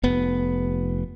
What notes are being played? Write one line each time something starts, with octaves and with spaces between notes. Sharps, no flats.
F1 B3